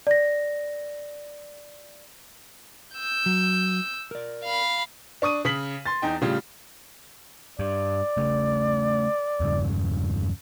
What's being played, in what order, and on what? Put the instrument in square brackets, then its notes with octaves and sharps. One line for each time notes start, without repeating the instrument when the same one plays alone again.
[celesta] D5 A#6
[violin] E6 G6
[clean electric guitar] F#3
A#4 D5
[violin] F5 B5
[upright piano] D4 C#6 D#6 D#7
C#3 D#6 B6 F#7
C6 A6
E2 D#4 G5
A2 C#3 G3 F4
[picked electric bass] G2 [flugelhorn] D5
[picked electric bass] C#3 A3
E2 G2 C#3